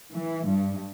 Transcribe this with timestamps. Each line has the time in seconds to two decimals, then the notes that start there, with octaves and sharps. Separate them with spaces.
0.16 E3
0.48 G2